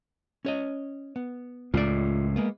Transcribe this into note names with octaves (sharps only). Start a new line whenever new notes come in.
C#4 C#5 D#5
B3
C#2 A2 F4 D5
G#3 A#3 B3